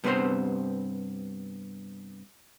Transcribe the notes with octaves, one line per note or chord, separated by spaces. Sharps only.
G2 C3 B3 B4 C5 C6